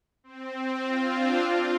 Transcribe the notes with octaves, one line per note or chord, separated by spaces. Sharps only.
C4
F4
D4
F4